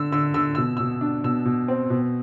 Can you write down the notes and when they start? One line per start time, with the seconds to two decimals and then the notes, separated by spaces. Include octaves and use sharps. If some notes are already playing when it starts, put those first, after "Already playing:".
Already playing: D3 E6
0.12 D3 E6
0.34 D3 E6
0.55 B2 E6
0.77 B2 E6
1.01 D4
1.24 B2 E6
1.45 B2
1.68 C4
1.90 B2